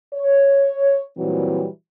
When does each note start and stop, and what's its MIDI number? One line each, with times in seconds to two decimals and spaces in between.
0.14 1.02 73
1.18 1.66 46
1.18 1.66 52
1.18 1.66 54
1.18 1.66 55
1.18 1.66 60